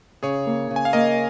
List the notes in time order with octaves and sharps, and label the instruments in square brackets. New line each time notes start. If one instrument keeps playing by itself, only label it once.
[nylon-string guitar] C#3 [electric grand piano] G#4 C#5
[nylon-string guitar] A#3
C#3
[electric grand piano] G#5
F5
[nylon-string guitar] A#3 [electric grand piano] A#4 D#5